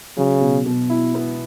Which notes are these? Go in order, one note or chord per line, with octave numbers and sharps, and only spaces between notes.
C#3 F#3
B2
B2
E4
B3